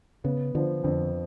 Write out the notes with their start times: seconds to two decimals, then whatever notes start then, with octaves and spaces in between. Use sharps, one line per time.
0.24 C#3 B3
0.55 D3 F3
0.84 F2 D3